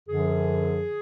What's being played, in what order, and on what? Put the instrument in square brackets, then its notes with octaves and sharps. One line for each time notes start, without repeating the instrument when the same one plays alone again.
[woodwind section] F#2 D3 F3 G#4